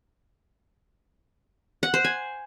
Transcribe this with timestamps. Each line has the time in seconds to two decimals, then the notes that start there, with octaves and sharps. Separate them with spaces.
1.83 F#5
1.94 C5
2.04 G#5